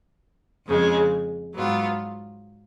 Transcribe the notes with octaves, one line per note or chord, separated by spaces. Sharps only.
F2 C#3 G#3
G#2 F#3 B3 F4